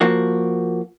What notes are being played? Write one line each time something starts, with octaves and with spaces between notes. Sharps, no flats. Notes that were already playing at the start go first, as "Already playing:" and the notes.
F3 A#3 F#4